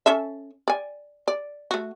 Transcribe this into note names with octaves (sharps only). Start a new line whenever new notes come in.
C#4 A4 E5
D5 G#5
D5
A3 F#4